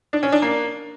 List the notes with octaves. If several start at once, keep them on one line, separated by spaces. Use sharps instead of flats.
D4
C#4
D4
A#3